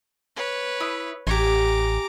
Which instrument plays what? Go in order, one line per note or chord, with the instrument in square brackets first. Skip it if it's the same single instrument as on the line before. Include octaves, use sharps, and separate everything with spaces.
[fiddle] B4 C#5
[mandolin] E4 D#6
[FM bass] A1 [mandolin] G4 G#5 [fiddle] A#5 D6